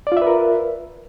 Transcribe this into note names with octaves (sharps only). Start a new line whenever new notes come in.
F4 A#4 B4 D5 E5